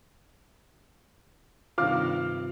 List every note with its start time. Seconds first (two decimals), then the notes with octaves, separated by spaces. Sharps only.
1.78 G2 C3 D#3 F4 F5 D6 F6